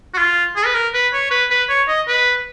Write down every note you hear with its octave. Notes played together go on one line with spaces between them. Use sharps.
F#4
F4
G#4
B4
A#4
B4
C#5
B4
B4
C#5
D#5
B4